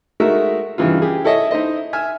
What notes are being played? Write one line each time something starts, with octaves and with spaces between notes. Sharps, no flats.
G#3 A3 D#4 F#4 A#4 E5
G2 C#3 E3 D#4 F4
G4 G#4
E4 A4 C#5 D#5 E5
D#4 E4 C5 D#5
E5 G#5 F6